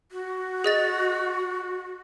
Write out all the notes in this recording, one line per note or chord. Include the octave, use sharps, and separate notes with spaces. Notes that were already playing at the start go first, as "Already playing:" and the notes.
F#4
G#4 D#5 A6